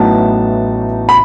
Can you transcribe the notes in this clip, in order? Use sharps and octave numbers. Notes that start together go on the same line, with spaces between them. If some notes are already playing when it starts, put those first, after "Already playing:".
Already playing: A1 A2 F#3 B3 D#4 A5
B5